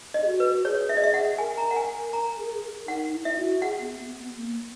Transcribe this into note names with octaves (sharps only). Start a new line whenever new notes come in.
D#5
G#4
F#4
B4
G#4 C#5
E5
D#5
E5
F#5
A#4 G#5
A#5
F#5
A#4 G#5
A#4 A#5
G#4
A#4
G#4
A#4
D#4 F#5
E4
E5
F#4
G#4 F#5
B3
B3
B3
A#3